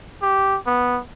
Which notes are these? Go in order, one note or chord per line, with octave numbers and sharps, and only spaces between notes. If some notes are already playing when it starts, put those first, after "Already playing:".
G4
B3